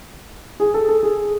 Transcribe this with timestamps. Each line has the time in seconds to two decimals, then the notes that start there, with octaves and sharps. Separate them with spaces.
0.60 G#4
0.74 A4
0.89 A4
1.03 G#4